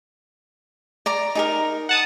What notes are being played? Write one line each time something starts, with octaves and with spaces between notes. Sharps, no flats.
D5 A#5 D6
D#4 G#4 A#4
F#5 A5 D#6